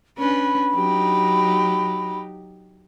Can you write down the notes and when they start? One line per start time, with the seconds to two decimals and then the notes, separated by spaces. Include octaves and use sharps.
0.18 C#4 D4 B4 B5
0.73 F#3 D#4 G4